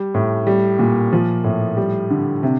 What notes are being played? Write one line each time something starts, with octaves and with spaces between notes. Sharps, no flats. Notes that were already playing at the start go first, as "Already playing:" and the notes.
Already playing: G3
A2
G3
A#2
F3
A2
G3
D3
C3